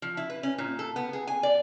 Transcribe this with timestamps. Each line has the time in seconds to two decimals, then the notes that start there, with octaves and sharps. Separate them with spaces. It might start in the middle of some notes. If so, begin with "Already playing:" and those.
0.02 F3
0.17 E4
0.30 B4
0.43 C#4
0.58 A#2
0.79 A4
0.96 B3
1.13 G#4
1.27 G#5
1.43 D5